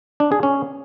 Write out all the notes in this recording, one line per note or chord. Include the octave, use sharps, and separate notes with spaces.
D4
G#4
C#4